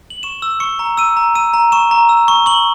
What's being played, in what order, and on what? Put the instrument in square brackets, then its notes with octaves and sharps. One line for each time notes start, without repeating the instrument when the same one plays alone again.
[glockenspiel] F#7
C#6 E7
E6
C#6 C#7
A#5
E6 D#7
A#5
E6 D#7
A#5
C#6 E7
A#5
E6
C#6
C#6 F#7